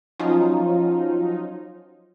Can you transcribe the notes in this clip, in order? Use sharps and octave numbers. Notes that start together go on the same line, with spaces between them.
F3 F#3 C#4 D#4 F4